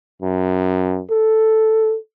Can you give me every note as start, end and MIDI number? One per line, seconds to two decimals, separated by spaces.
0.22 1.01 42
1.10 1.96 69